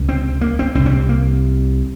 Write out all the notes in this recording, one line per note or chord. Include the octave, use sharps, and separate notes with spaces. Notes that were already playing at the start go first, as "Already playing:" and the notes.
Already playing: C#2 C3
C4
A#3
C4
C2 C3 C4
C#4
C4
A#3